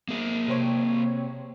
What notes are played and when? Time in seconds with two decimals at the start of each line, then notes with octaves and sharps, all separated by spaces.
0.08 A#3 G#4
0.48 C3 C4 C#5